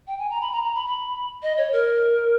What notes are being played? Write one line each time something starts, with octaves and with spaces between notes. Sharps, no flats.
G5
G#5
A#5
B5
A#5
A#5
B5
B5
D#5
C#5
A#4